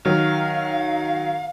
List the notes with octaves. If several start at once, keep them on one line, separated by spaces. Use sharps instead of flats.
D#3 F#3 F5